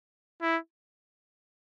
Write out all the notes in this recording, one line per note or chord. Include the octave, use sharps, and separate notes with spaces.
E4